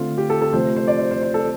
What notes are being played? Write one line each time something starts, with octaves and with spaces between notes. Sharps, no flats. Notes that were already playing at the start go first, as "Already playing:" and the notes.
Already playing: D3 A3 C4 F4
G4
A4
A4
C3 F3 A3 C5
C5
D5
C5
C5
C5
A4